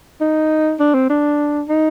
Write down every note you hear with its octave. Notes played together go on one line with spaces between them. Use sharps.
D#4
D4
C4
D4
D#4